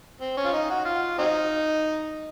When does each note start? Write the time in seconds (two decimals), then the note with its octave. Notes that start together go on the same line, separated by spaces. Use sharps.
0.21 C4
0.37 C#4
0.45 F4
0.53 D#4
0.70 F#4
0.85 F4
1.18 F#3 C4 D#4